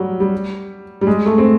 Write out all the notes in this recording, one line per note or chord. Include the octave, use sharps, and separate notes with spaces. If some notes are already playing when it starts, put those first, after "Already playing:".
Already playing: F#3 G3
G3
G3
G#3
A3
C4